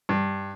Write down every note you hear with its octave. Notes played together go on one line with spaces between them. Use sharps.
G2